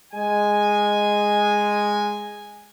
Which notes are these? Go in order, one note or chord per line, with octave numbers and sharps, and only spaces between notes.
G#3 G#5